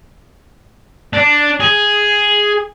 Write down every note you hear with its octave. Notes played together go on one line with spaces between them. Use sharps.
D4
G#4